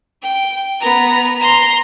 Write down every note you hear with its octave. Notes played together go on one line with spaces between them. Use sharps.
G5
B3 A#5
A#5 C6